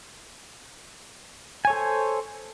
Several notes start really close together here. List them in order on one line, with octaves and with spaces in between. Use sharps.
G#5 C#5 A4 C5